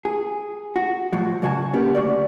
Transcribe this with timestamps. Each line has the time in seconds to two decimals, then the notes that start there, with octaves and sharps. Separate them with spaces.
0.05 G#4
0.76 F#4
1.13 A2 F3 F#3
1.42 F#2 C#3 F#4 G#5 A5
1.73 A#3 B3 C#4 G4 A#4 B4
1.95 D2 F#4 D5